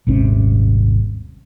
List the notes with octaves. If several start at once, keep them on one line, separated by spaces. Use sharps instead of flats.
D#1 G#1 C3 C#4